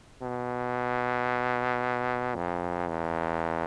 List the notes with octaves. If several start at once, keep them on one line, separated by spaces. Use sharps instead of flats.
B2
F2
E2